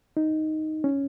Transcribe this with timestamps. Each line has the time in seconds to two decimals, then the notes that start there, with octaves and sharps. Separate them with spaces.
0.17 D#4
0.84 C#4